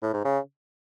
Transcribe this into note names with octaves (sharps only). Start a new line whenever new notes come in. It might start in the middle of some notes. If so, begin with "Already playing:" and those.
A2
G#2
C#3